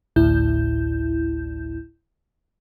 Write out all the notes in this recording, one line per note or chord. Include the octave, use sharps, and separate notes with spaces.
G#1 D2 A2 E4 G6